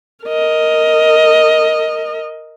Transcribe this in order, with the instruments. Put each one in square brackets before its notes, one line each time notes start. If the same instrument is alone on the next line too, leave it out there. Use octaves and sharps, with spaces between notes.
[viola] A#4 D#5